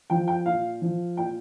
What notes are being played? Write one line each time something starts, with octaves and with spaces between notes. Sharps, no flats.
F3 G5
G5
A#2 F5
F3
A#2 G5